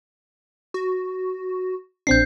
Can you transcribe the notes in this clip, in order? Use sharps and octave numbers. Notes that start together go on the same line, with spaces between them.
F#4
A#1 C4 D4 G6 C7